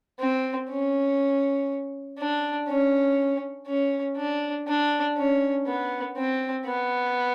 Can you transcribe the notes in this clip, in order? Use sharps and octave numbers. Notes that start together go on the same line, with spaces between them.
C4
C#4
D4
C#4
C#4
D4
D4
C#4
B3
C4
B3